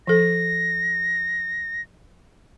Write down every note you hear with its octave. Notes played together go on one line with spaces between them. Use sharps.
F3 A4 A#6